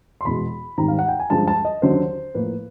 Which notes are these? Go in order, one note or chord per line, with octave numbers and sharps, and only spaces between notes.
C6
E2 B2 G#3 B5
G#2 D#3 G3 C4 A#5
F5
F#5
G5
G#5
G2 D3 F3 G#3 A5
A5
D#5
D#2 D3 F#3 C5
A2 F3 A#3 B4